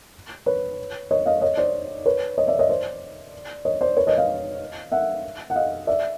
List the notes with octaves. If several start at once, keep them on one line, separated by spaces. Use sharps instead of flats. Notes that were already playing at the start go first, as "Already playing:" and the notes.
B4 C#5
C#5 D#5
D#5 F5
C#5 D#5
C5 D5
B4 C#5
C#5 D#5
D5 E5
C#5 D#5
C5 D5
C#5 D#5
C5 D5
B4 C#5
C#5 D#5
D#5 F5
E5 F#5
F#5
D#5 F5
D5 E5